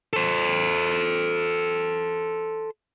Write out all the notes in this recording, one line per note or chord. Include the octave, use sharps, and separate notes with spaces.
A4 C5